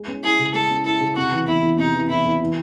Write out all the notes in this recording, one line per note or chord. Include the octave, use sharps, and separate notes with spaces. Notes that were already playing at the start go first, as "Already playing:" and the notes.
Already playing: G#3
C#4
E4 G#4
C#3
G#3 A4
C#4
E4 A4
C#3
C3 F#4
E3
E2 E4
E2
C3 D#4
E3
E2 E4
E2
E3